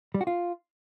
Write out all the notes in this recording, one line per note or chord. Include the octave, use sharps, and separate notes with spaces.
G3
F#4
F4